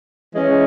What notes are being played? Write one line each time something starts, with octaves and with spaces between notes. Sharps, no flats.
E3 G#3 C#4